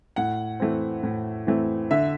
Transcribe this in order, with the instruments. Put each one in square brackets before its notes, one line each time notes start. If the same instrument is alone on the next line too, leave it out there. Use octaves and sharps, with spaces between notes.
[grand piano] A2 F#5
E3 A3 C4
A2
E3 A3 C4
D3 E5